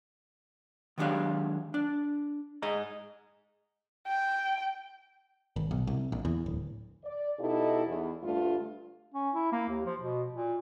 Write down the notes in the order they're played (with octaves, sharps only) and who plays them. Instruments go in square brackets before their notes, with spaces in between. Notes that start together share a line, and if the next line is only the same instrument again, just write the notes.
[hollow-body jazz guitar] D#3 F#3 G#3 D4 G4 F5
D4
G#2 G#4 D#5 A#5
[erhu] G5
[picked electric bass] G#1
B1
C2
A#1
E2
D1
[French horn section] D5
B2 D#4 E4 G4 A4
E2
D2 G2 A3 F4
[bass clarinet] C#4
E4
A#3
D#2
F3
B2
A#2